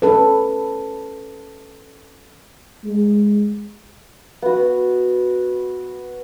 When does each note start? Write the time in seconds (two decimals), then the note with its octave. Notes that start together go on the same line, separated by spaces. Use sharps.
0.02 C#4 A4 B4
2.84 G#3
4.42 B3 F#4